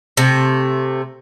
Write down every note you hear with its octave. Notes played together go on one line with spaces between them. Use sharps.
C3 A3